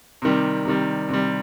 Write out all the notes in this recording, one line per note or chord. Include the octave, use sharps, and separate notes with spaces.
C3 D#3 G3
C3 D#3 G3
C3 D#3 G3